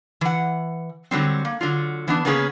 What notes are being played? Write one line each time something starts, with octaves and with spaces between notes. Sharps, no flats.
E3 F#5
D3 F#3 G3 C4
A#3
D3 F#3 F4
E3 B3 D4
C#3 A#3 B3 C#4 G#4 B4